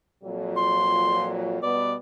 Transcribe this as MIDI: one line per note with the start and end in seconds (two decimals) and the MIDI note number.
0.24 1.57 41
0.24 1.57 46
0.24 1.57 54
0.57 1.27 84
1.63 1.95 47
1.63 1.95 55
1.63 1.95 59
1.63 1.94 74